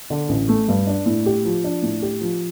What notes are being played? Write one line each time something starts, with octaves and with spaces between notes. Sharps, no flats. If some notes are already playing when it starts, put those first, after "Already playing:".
D3
A1
A3
G2
D4
A2
G4
F3
D4
A2
G4
F3